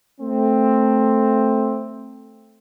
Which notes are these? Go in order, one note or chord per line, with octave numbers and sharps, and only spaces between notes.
A3 C4